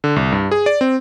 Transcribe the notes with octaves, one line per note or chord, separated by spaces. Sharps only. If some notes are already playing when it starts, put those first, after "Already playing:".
D3
C2
G2
G#4
D5
C4